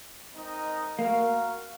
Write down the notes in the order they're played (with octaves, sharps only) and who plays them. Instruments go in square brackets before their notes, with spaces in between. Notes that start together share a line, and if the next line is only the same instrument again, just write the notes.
[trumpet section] G#3 C4 D#4 A#4 D#5
[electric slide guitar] A#3 [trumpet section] F#4 A#4 F5